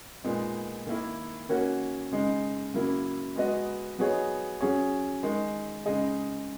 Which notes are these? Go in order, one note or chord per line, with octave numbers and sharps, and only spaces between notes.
A#2 G#3 B3 D#4
D#3 A#3 E4
D#3 A#3 C#4 F#4 C#5
C#3 G#3 D#4
C#3 F#3 A#3 E4
G#3 B3 F#4 B4 D#5
F#3 B3 D#4 G#4 C#5
F#3 C#4 G#4 C#5
D#3 G#3 D#4
C#3 G#3 D#4 G#4 D#5